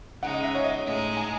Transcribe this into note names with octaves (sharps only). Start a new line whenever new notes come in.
C#3 G#3 D#4 F#5
D#5
E5
C#5
D#5
A2 G#3 D#4
G#5